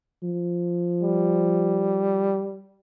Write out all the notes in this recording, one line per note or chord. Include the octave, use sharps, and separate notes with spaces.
F3
G3